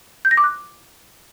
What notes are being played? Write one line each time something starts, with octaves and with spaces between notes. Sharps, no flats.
G6
A#6
D6
F#6